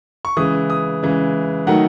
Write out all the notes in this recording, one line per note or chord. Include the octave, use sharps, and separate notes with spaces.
C#6
C#3 E3 G#3 D#6
D#6
C#3 E3 G#3
D#3 F#3 A3 D#4 F#5